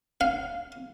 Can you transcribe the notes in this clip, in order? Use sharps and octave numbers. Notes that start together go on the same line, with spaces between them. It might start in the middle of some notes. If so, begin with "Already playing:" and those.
F5